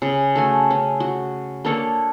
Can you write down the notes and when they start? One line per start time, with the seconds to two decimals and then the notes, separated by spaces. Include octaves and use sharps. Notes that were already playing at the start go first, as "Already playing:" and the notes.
0.02 C#3
0.36 A3 F#4 G#5
0.70 C#4
1.00 F#4
1.65 A#3 D4 A4 C#5